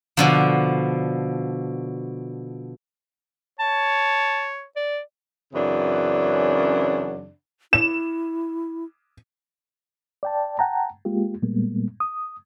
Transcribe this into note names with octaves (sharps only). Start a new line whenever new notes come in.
B2 D3 F3
C#5 A5
D5
F#2 C#3 E3 C4 D4
E4 E7
D5 G5 A5
F#5 G5 A5 A#5
G#3 A#3 F4 G4
A#2 G3 G#3 A#3 B3
D#6